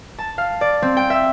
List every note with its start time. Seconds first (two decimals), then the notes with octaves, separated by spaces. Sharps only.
0.18 A5
0.38 F5
0.61 D5
0.82 C4
0.97 G5
1.10 E5